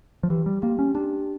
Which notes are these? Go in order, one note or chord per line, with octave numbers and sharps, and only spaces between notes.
F3
E3 G4
G3
A#3 G4
C#4
D4 G4